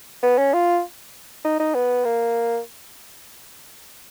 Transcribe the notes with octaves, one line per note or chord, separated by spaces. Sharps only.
B3
C#4
F4
D#4
D#4
B3
A#3